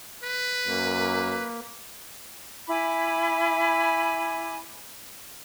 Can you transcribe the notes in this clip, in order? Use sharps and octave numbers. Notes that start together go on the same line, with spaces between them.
B4
F#2 A#3
E4 G#5 B5 D6